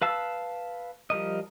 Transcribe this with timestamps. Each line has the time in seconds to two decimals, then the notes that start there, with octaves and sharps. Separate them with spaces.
0.02 B4 F5 A5 E6
1.10 F3 G3 A#4 D#5